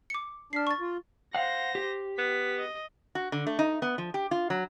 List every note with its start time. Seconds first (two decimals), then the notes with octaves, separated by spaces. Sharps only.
0.10 D6 C#7
0.53 D4 F6 B6 C7
0.67 C#6 A6
0.80 F4
1.35 C5 F5 F#5 A#6
1.75 G4
2.18 B3 B6
2.58 D#5
3.15 F#4
3.32 D3
3.47 A3
3.59 D#4
3.82 B3
3.98 F3
4.14 G4
4.31 F4
4.50 F#3